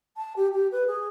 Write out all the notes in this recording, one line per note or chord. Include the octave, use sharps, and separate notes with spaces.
A5
G4
G4
B4
G#4